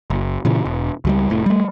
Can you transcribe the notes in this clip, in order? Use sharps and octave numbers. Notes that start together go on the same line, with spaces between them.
F#1
A#2 C#3 E3
E1
C#2 F#3 G3
F1 A2
G3 A3